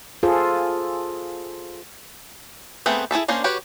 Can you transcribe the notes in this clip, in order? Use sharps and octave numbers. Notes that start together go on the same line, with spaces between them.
F4 G#4 A4 C5
A3 B3 C4 G#4 B4
E4 G#4 A4 E5
A#3 C#4 D4 C5
F#4 G4 B4 C#5